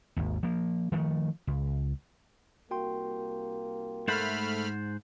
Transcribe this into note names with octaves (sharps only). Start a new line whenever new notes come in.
G#1 D#2
F3 A#3
D#3 F3 G#3 A3
C#2
C2 A#3 F#4 G5 C6
G#2 A3 C5 F#5 B5 F6 A6